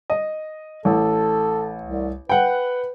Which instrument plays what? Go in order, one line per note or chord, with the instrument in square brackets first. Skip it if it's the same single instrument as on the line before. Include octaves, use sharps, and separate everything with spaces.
[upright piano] D#5
[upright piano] A1 [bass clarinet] A4
[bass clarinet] C2
[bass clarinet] B4 [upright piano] F#5 G5